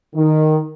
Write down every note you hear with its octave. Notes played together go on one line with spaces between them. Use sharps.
D#3